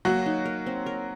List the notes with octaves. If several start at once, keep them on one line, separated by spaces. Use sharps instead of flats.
F#3 A#3 F#4
D#4
A#4
C4
A#4